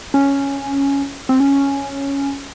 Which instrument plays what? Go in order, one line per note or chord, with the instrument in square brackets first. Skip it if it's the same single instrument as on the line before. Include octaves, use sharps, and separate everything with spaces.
[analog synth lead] C#4
C4
C#4